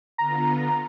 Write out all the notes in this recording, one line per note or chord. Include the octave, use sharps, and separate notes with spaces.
D3 B3 F4 A#5